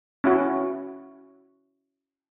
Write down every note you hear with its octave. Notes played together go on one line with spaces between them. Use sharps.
C#4 E4 F#4